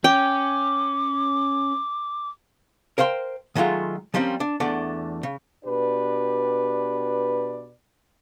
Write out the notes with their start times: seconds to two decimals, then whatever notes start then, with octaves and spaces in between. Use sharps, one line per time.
0.04 C#4 G5 D6
2.98 A#4 C5 F5 G5 C6
3.55 D#3 F#3 G#3 A3 F4
4.14 F3 G3 A#3 C4 C#4
4.40 D4
4.60 E2 A3 D4 D5 F#5
5.23 C#3
5.65 B2 D4 G4 B4 D5